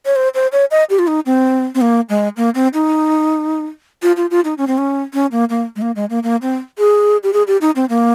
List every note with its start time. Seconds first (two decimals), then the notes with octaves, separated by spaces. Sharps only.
0.06 C#5
0.16 C5
0.34 C5
0.52 C#5
0.71 D#5
0.90 G4
0.99 F4
1.07 D#4
1.26 C4
1.75 C4
1.81 A#3
2.09 G#3
2.37 A#3
2.55 C4
2.74 D#4
4.02 F4
4.17 F4
4.31 F4
4.44 D#4
4.58 C#4
4.67 C4
4.78 C#4
5.13 C#4
5.32 A#3
5.50 A#3
5.76 G#3
5.82 A#3
5.96 G#3
6.10 A#3
6.23 A#3
6.42 C4
6.78 G#4
7.23 G4
7.33 G#4
7.47 G4
7.61 D#4
7.76 C4
7.89 A#3